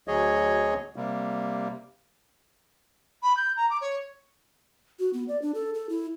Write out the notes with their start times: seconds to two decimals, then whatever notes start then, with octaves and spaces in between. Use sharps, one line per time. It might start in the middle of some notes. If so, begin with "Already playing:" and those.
0.08 D2 F#3 G#4 C#5 D#5
0.96 C3 G3 A#3
3.23 B5
3.37 G6
3.57 A#5
3.70 D6
3.81 C#5
4.99 F#4
5.14 B3
5.28 D5
5.42 D4
5.55 A4
5.74 A4
5.89 E4